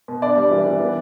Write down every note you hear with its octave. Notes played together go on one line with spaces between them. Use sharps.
B2
D4 D5
G3
E3
E3
B3